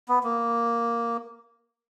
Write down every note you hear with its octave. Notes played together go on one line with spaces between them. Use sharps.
B3
A#3